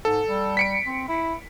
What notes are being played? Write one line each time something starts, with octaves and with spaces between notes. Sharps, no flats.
G#2 A4
G3
B6 C#7 D7
C4
E4